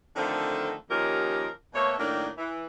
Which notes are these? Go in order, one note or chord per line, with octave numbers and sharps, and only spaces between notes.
D3 D#3 F3 A3 C4 A4
D#2 F3 C#4 D#4 G4 A#4
B2 A3 A#3 A4 C#5
A2 D#3 F#3 A#3 D4
E3